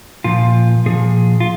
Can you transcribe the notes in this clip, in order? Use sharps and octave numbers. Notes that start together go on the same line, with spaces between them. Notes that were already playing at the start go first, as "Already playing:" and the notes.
A#2 F3 F4
A#2 F3 G#4
F4